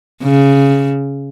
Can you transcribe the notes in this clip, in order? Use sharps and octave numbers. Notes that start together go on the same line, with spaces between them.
C#3